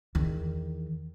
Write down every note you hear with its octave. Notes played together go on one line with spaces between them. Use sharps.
E2 D#3